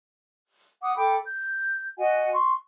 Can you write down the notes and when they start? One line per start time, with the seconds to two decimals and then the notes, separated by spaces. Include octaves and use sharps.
0.82 F#5 D6 D#6
0.96 A4 G5 B5 D6
1.25 G6
1.99 F#4 D#5 F#5 G#5
2.32 C6 C#6